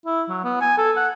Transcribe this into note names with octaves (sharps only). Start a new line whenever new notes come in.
E4
F#3
B3
G#5
A4
F#5